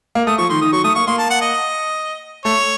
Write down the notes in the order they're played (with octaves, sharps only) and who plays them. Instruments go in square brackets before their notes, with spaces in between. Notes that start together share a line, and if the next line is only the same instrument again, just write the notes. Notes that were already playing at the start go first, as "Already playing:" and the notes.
[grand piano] A#3
[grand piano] A3 [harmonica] D#6
[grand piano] F3 [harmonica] C#6
[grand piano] D#3 [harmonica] C6
[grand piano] D#3 [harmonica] D#6
[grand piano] F#3 [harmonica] C#6
[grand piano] A3 [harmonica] D#6
[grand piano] A#3 [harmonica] C#6
[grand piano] A#3 [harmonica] C6
[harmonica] A5
F#5
D#5
[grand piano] A3 [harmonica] C#5